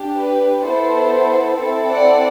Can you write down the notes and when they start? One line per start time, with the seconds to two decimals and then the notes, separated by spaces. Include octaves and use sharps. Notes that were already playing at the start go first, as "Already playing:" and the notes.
Already playing: D4 G4
0.16 B4
0.63 B3 E4 A4 C5
1.57 C4 E4 A4
1.89 D5 F#5